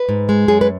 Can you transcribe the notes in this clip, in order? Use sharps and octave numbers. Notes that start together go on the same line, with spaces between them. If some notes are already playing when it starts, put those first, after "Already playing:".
Already playing: B4
G#2
G#3
F#2 G#4
B4